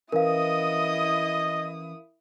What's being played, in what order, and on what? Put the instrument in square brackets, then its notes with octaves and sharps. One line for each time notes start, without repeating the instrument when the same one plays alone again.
[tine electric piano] E3 C#4 [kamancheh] E4 D#6 [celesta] A#4 F5 [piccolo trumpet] D#5